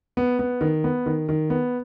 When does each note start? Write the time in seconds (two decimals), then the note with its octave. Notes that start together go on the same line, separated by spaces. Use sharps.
0.17 B3
0.39 B3
0.61 D#3
0.84 B3
1.06 D#3
1.29 D#3
1.50 B3